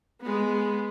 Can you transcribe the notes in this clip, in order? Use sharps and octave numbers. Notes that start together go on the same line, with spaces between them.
G#3 B3